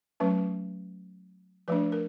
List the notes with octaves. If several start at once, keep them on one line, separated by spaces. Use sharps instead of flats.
F#3 A3 C#4 B4
F3 A3 D4 B4
A#4